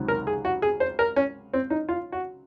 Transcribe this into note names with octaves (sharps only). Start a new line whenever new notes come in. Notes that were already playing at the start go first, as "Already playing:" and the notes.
Already playing: C#2 C3 D#3 F#3
A#4
G#4
F#4
G#4
C5
A#4
C#4
C4
D#4
F4
F#4